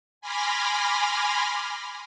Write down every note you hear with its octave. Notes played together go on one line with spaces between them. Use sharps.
G#5 B5 C6 D6 F6 A#6